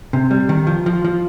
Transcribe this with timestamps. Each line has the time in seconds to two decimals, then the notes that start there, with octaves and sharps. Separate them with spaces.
0.13 C3
0.31 G3
0.49 D#3
0.67 F3
0.86 F3
1.04 F3